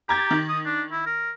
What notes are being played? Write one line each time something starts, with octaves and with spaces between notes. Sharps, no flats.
G4 A#5 G#6 A6
D#3
D#6
D4
E4
A#4